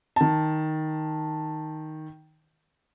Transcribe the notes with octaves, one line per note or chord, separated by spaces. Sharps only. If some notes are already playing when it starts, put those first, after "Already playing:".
D#3 A5